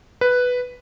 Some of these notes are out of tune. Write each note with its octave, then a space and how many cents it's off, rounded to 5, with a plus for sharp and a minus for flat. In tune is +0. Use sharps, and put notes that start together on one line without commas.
B4 +0